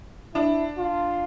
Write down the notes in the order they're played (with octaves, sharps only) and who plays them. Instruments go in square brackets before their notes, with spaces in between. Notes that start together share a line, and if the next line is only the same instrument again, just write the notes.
[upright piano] D4 [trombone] E4
[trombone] F4